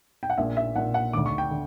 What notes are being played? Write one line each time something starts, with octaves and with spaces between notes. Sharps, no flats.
G5
F#5
A#1 A#2 E5
E5
A#1 A#2 F#5
F#5
D2 D3 D6
C#6
G5
D3